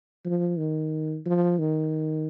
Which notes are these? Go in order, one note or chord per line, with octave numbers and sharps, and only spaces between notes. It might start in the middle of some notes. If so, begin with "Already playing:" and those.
F3
D#3
F3
D#3